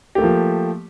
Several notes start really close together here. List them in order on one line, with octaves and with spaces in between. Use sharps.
G4 A3 A#3 F3